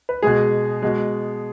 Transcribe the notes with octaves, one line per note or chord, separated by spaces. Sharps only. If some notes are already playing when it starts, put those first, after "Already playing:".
B4
B2 G#3 G#4
B2 G#3